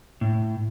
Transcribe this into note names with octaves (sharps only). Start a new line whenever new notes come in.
A2